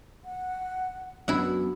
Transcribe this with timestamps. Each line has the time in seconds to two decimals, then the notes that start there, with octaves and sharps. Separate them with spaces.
0.25 F#5
1.28 F#2 E3 B3 D4 E4 F#4 F#5